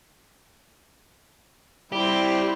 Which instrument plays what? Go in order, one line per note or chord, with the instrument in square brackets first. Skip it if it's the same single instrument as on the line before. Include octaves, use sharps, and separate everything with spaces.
[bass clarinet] G3 [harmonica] C4 [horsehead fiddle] E4 [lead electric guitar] G4